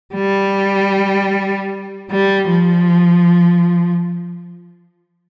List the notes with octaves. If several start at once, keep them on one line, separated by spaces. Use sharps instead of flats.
G3
G3
F3